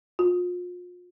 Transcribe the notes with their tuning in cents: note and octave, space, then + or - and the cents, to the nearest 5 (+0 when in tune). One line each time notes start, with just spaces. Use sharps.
F4 +35